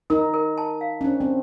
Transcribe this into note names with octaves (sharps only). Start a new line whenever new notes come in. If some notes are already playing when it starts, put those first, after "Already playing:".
D#4 A#4
A#4
A5
F5
C#4
D4 C5
C4